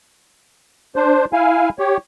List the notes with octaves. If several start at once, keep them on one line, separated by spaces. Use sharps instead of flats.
D4 C5
E4 F5 G#5
G4 C#5